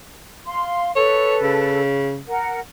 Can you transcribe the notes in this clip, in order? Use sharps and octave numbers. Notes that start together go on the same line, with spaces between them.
F5 C6
A4 B4 C#5
C#3
A#4 F#5